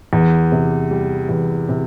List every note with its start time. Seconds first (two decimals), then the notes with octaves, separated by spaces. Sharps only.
0.13 E2
0.52 C3
0.91 G3
1.29 E2
1.69 C3